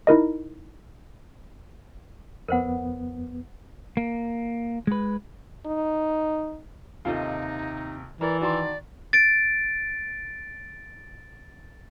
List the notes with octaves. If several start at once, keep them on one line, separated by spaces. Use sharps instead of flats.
D#4 E4 A#4 D#5
F2 B3 A#4 C5 F#5
A#3
G#3 B4
D#4
D#2 C3 D#4 F4 A4 D#5
E3 A#4 D5
D#3 F#4 D5 A5 A#5 C6
A6 D7